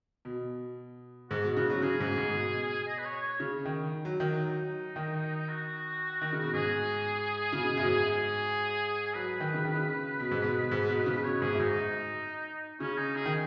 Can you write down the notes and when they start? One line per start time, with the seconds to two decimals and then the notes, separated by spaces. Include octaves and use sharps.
0.25 B2
1.30 G#2 F#4
1.44 B2
1.56 C#3 F#4
1.69 F#3 F#4
1.82 C#3 G#4
2.00 G#2
2.17 G#2
2.34 B2
2.87 D#5
2.98 B4
3.05 C#5
3.22 C#5
3.40 C#3
3.65 D#3
4.05 F#3
4.20 D#3
4.33 F#3
4.45 D#4
4.96 D#3
5.49 F#4
6.21 D#3
6.33 C#3
6.43 B2
6.53 G#2 G#4
7.53 C#3
7.57 B2
7.77 F#2
7.85 G#2
8.10 G#4
9.07 G#4
9.14 F#3 B4
9.27 F#3
9.40 D#3
9.54 C#3
9.65 D#3
9.75 C#3
10.20 B2
10.31 G#2
10.42 B2
10.71 G#2
10.90 B2
11.06 C#3
11.24 B2 C#5
11.42 G#2 G#4
11.53 F#2
11.59 G#2 D#4
12.80 C#3 C#4
12.98 D#4
13.16 G#4
13.26 D#3